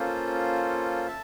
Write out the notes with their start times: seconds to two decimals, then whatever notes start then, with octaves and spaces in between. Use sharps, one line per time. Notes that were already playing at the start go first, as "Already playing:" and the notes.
Already playing: A#3 C#4 F4 A4 C5
1.06 E5 A5